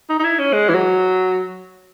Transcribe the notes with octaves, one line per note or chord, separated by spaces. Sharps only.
D#4
D#4
E4
C#4
G#3
E3
F#3